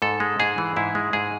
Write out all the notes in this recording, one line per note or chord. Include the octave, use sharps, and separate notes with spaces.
G#2 A4
G#3
G#2 G#4
E3
G#2 E4
G#3
G#2 G#4